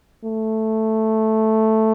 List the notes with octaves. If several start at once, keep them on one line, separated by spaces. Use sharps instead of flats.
A3